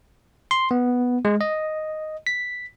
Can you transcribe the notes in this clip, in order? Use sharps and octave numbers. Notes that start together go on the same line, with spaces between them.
C6
B3
G#3
D#5
B6